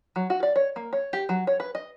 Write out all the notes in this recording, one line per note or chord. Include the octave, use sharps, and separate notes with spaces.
F#3
F#4
D5
C#5
A#3
C#5
G4
F#3
C#5
B4
D#5